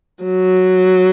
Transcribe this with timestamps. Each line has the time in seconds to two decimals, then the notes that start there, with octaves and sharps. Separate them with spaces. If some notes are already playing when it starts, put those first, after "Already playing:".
0.24 F#3